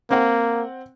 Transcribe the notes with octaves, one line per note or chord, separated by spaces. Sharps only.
A#3 C4 F#5